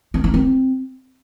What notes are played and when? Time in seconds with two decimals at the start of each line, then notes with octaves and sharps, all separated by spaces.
0.14 C4
0.24 D#4
0.34 C4